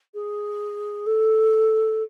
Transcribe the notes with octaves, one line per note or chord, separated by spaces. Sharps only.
G#4
A4